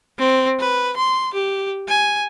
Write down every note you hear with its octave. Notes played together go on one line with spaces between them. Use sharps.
C4
B4
C6
G4
G#5